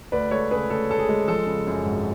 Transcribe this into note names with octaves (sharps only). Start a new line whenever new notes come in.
D2 B4 D5
G#3 A4 C#5
C#3 G#4 B4
D2 A4
D2 A4
G#4
G#3
F3 A4
C#3
F#2
G#1